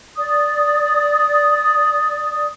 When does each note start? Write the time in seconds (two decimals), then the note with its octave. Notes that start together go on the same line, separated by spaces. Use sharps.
0.17 D5 D#6